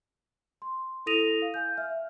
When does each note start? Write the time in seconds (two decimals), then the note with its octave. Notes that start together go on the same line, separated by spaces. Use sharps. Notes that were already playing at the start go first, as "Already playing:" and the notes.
0.62 C6
1.06 E4 A4 D#6 A#6 D#7 F7
1.42 F5
1.54 F5 G#5 G6
1.77 E5 F6